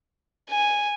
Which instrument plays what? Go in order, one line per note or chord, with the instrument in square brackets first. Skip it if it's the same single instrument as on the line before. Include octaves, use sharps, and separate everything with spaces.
[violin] G#5